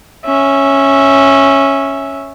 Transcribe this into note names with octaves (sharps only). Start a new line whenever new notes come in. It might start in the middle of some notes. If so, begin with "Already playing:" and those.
C#4 E5